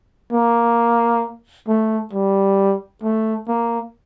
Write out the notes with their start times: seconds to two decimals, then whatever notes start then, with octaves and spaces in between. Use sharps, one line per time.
0.33 A#3
1.68 A3
2.13 G3
3.03 A3
3.48 A#3